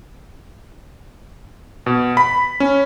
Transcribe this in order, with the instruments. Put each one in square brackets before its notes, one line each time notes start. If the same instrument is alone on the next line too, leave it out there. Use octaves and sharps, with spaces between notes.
[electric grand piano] B2
B5
C#4